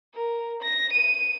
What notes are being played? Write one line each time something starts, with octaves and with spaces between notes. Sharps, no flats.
A#4
A#6
D#7